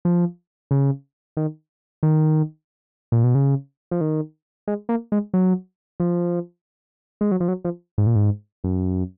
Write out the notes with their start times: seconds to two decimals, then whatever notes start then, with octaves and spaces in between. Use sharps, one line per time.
0.05 F3
0.71 C#3
1.37 D#3
2.03 D#3
3.12 A#2
3.24 B2
3.35 C#3
3.91 F3
4.01 D#3
4.67 G#3
4.89 A#3
5.12 G#3
5.34 F#3
6.00 F3
7.21 G#3
7.31 F#3
7.40 F3
7.48 F#3
7.65 F3
7.98 G#2
8.07 A#2
8.15 G#2
8.64 F#2